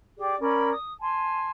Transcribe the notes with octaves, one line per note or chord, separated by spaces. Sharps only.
G4 G#4 D5
C#4 A#4 D5 B5
D#6
G#5 A5 C6